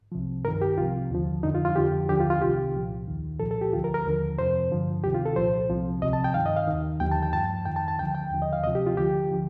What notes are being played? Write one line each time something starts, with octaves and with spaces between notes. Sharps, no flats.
C2 C3 F3
G2 D#3 A#4
G4
C2 C3 F3 F4
D#2 D3 F3
F2 D3 F3 D#4
F4
F4
F2 D3 F3 G4
D#2 D3 F3 G4
F4
F4
C2 C3 D#3 G4
C2 A#2 F3
D#2 D#3
C2 A#2 F3 A4
A4
G4
D2 D3 F3 F4
A#4
A#4
D#2 D3 F3
F2 C3 F3 C5
G2 D3 F3
D2 C3 D#3 G4
F4
A4
C2 A#2 F3 C5
C2 C3 F3
D2 C3 F3 D#5
A5
G5
G2 D#3 F5
D#5
F5
D#2 D#3
D#2 D3 F3 G5
A5
G5
G2 F3 A5
F2 D#3 G5
A5
A5
D2 D3 F3 G5
G5
D#2 D3 F3
D#5
F5
D2 C3 F3 D#5
G4
F4
D2 D3 F3 G4
D3 F3